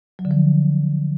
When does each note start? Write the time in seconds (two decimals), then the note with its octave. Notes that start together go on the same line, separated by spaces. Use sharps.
0.19 F#3
0.25 D3
0.31 F3